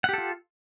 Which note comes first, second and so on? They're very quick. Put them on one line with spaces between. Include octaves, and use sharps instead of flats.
F#5 G4 A4 F4